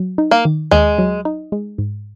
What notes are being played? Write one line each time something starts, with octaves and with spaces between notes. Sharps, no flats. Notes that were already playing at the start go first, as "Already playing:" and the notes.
Already playing: F#3
D#4
A#3
D#3
D#2 G#3
F#3
D#4
G#3
G#2